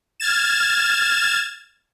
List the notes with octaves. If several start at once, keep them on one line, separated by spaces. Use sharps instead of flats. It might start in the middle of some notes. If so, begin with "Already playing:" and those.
F6 G#6 A6 E7